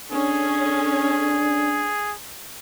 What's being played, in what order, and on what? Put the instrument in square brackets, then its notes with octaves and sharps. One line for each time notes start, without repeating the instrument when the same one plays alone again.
[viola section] C#4 A4 [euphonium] D4 [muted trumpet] G#4